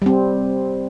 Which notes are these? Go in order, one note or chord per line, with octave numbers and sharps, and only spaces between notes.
G3 C4